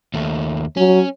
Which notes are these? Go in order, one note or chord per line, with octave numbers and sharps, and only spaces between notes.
D#2 A3
F#3 C#4